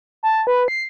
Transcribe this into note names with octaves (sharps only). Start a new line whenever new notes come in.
A5
B4
C7